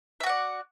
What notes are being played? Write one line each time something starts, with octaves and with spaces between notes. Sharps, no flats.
F#4 D5 E5 F#5